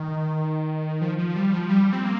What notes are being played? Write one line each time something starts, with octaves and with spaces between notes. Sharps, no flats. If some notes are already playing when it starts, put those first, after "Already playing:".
Already playing: D#3
F3
F3
G3
F3
G3
C4
A#3